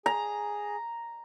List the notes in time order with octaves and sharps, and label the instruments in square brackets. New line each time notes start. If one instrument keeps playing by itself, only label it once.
[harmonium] G#4 [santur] A#5